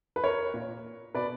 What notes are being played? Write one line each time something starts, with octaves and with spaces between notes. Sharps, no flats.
B4
A#4 C#5
A#2
B2 B4 D5